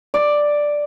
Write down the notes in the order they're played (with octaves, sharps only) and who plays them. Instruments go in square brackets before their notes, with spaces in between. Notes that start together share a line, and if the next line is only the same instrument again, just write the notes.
[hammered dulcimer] D5